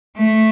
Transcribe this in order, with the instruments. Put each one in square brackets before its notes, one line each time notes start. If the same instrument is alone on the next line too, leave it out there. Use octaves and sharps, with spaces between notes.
[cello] A3